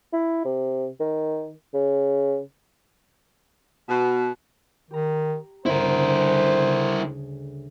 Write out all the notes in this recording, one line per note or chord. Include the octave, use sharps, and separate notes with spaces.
E4
C3
D#3
C#3
B2
D#3 G4 A#5
G1 D2 C#3 E4 A#4 C5
G#4